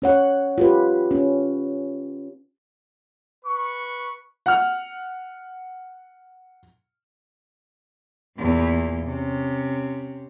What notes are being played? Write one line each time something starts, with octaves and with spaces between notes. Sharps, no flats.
C#4 C#5 F#5
F4 G4 B4
C#4
B4 C#6
F#5 F6
E2 A#2
C3 C#4